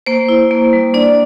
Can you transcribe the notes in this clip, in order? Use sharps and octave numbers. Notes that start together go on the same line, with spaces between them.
A#3 C5
E4
A#3
G3
D4 D5